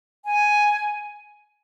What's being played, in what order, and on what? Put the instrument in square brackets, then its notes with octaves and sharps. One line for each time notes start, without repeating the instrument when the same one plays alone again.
[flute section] G#5